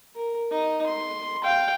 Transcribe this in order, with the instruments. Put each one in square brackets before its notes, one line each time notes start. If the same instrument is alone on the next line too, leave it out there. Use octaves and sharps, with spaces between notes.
[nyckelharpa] A#4
D#4 D#5
C6
F5 G5